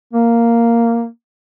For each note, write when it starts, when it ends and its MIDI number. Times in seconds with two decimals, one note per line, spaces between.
0.13 1.06 58